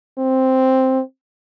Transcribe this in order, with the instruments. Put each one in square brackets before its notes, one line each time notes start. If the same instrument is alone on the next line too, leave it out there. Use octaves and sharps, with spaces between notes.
[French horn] C4